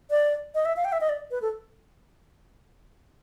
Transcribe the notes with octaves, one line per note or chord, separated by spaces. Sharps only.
D5
D#5
E5
F5
G5
E5
D#5
D5
B4
A4